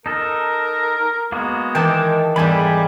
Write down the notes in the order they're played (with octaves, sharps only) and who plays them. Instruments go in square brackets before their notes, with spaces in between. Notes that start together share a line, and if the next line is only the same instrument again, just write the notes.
[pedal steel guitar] D#4 A4 [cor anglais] A#4
[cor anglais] G#3 [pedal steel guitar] A#3 B3 F#4
[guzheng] D#3 E3 [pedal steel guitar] G5 A5 D6
[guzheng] E2 G#2 [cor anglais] G3 [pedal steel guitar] A4 G#5 B5